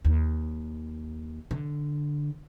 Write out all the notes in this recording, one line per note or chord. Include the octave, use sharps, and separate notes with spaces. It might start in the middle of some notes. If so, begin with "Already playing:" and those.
D#2
D3